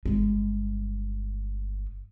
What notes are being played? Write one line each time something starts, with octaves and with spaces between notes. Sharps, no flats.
G1 G#3